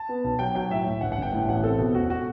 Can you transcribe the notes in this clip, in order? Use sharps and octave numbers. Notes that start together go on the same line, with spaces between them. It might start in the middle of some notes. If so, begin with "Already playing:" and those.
Already playing: A5
B3
B1
F#3 G5
F#3 G5
A2 E5
A2
G1 F#5
F#5
G1 G5
A2 F#5
A1 F#5
C4 A4
B2
E1 F#4
F#4